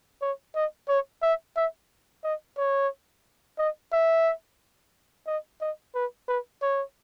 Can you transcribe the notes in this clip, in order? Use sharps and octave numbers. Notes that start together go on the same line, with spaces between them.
C#5
D#5
C#5
E5
E5
D#5
C#5
D#5
E5
D#5
D#5
B4
B4
C#5